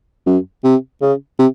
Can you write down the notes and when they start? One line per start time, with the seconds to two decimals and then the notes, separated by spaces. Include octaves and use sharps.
0.26 F#2
0.64 C3
1.02 C#3
1.39 C3